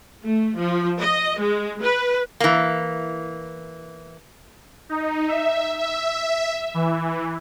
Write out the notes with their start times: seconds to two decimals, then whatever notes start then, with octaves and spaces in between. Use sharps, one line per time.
0.24 A3
0.58 F3
1.00 D#5
1.39 G#3
1.82 B4
2.40 E3 A#3
4.89 D#4
5.28 E5
5.79 E5
6.74 E3